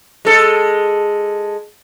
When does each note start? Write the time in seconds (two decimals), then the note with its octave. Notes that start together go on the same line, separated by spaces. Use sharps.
0.25 G#3 A4